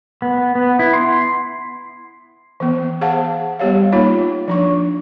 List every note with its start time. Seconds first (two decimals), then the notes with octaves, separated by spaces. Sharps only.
0.22 B3
0.55 B3
0.79 E4
0.93 C6
2.60 E3 B3
3.01 G#4 C5 F5 F#5 A5
3.59 G3 B3 G4 C#5 F5
3.92 A#3 D#4 F4 C#5 B5
4.48 F3 D4 C#6